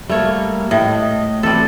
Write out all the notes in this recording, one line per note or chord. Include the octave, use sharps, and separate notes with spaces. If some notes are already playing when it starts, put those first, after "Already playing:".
G3 A3 A#3 C#5
A2 D#5
E3 G3 C4 A4